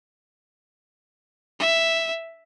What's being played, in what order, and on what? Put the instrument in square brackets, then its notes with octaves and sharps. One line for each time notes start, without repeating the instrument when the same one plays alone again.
[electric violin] E5